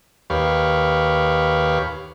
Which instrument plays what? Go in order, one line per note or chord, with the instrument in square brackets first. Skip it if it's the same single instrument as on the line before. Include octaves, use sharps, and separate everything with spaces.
[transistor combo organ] D#2 G4 B4 C#5 F5